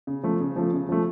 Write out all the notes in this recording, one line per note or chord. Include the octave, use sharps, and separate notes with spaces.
C#3
F3 A3
C#3
F3 A3
C#3
F3 A3